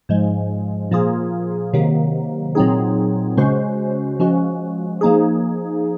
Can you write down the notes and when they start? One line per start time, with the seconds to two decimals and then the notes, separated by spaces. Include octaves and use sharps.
0.09 G#2 F3 G#3
0.91 A#2 F3 A#3 F4 G#4
1.73 C3 D#3 F#3 A#3
2.55 A#2 F#3 C4 D#4 G#4
3.37 C#3 G#3 C#4 F#4 C5
4.20 F3 G#3 C#4 F#4
5.01 F3 A#3 D#4 G#4